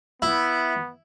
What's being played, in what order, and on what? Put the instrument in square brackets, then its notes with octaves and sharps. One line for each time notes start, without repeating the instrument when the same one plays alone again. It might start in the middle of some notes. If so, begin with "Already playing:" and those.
[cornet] B3 [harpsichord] E4